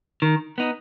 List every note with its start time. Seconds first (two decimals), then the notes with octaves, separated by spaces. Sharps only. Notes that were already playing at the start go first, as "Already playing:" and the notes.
0.22 D#3
0.58 B3 D#4